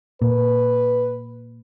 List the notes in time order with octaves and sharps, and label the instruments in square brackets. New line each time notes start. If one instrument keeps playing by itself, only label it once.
[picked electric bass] A#2 [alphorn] B4